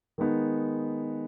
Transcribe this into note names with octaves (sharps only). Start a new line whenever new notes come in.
D#3 G#3 B3 D#4